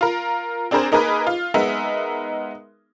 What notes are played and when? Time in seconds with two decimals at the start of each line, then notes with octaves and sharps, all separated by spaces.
0.01 F4 A#4
0.71 C4 D4 G#4 A#4 C5
0.92 A#3 D#4 G#4 A#4 B4 D#5
1.27 F4
1.54 G#3 B3 D#4 A#4 E5